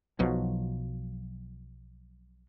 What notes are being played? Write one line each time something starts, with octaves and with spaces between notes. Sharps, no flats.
B1 B2 F3 F#3